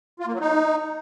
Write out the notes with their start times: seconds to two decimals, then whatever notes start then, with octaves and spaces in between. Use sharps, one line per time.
0.20 F4
0.27 A#3
0.33 F#3
0.40 D#4